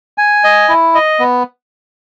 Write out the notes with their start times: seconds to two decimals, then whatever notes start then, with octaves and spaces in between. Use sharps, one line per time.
0.18 G#5
0.44 D#5
0.69 E4
0.94 D#5
1.20 B3